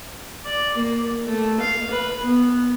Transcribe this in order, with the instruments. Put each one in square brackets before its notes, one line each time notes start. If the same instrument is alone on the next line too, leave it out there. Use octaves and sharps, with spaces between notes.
[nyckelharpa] D5
A#3
A3
F5
B4
B3